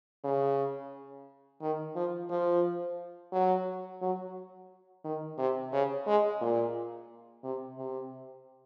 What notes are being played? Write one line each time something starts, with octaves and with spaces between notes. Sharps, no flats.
C#3
D#3
F3
F3
F#3
F#3
D#3
C3
C#3
G#3
A#2
C3
C3